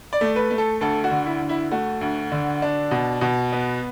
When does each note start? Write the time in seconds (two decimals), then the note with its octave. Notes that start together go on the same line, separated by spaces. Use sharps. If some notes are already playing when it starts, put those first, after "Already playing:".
0.13 D5
0.21 A3
0.36 B4
0.51 A3
0.58 A4
0.81 D2 A4
1.04 F#4
1.11 D3
1.26 E4
1.42 D2
1.49 E4
1.71 A3 F#4
2.01 D2
2.32 D3
2.62 D4
2.91 B2
3.21 B2
3.53 B3